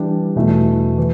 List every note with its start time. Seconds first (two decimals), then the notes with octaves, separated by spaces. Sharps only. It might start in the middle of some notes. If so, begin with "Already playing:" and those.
Already playing: E3 G3 D4 G4
0.36 E2 B2 A3 E4
0.98 E3